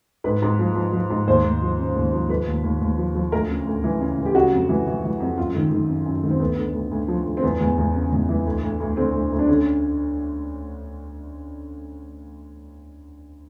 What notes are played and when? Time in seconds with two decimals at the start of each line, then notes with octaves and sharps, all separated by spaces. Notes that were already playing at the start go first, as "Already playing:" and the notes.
0.24 G#2 B4
0.42 G#2
0.59 F3
0.75 F3
0.93 F3
1.10 G#2
1.27 D#2 C5
1.44 D#2
1.62 F3
1.79 C#3
1.96 D#2
2.13 F3
2.29 F3 B4
2.47 D#2
2.64 D#2
2.81 D#2
2.98 F3
3.15 F3
3.32 D2 A#4
3.49 C#3
3.67 D2
3.84 E3
4.01 C#3
4.18 E3
4.26 G4
4.35 C#3 F#4
4.52 F2
4.69 E3
4.87 E3
5.04 E3
5.20 F2
5.37 F#2 F4
5.55 D#3
5.71 D#3
5.89 F#2
6.06 F#2
6.24 D#3
6.31 C4
6.40 D2 B3
6.58 D3
6.74 D2
6.91 D2
7.08 F3
7.26 D2
7.37 C4
7.43 E2 B3
7.61 E2
7.78 E2
7.94 C#3
8.12 E2
8.29 E3
8.46 D2
8.63 D2
8.80 D2
8.97 D3 C4
9.14 D2
9.32 D2
9.39 D4
9.48 D3 C#4